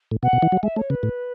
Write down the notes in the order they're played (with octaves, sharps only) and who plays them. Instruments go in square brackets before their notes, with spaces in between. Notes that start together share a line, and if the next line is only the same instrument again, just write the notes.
[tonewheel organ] A2
[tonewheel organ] B2 [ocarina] F#5
[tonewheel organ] B2
E3
F#3
[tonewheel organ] G#3 [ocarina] E5
[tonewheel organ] A3 [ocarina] C#5
[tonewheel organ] C#3 [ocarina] B4
[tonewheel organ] A2